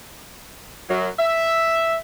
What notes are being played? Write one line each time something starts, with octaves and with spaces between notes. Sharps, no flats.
F#2 F#3
E5